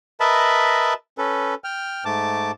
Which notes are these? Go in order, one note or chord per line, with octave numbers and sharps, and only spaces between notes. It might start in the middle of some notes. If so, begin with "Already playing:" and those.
A#4 B4 D#5 E5 A5 B5
C#4 A4 B4
G5 F6
G#2 A3 A5 D6